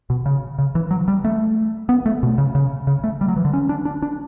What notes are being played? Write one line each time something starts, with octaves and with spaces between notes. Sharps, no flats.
B2
C#3
C#3
E3
F#3
G3
A3
B3
A3
B2
C#3
C#3
C#3
A3
G3
F#3
E3
D3
C#4
D4
D4
D4